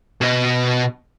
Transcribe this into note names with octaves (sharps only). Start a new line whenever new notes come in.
B2 D#5